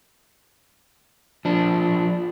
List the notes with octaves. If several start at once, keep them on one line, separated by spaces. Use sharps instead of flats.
F3 D4